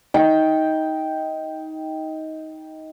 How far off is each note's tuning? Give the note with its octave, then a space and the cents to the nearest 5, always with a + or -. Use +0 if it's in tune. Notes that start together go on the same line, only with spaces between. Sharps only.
D#4 +20 G5 +0